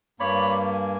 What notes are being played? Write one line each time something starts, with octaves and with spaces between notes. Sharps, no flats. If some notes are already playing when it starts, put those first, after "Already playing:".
G2 A#3 C#5 D5 B5
G#5